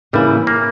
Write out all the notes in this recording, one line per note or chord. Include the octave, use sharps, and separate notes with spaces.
C#3 E3 G3 A#3 E4
A#3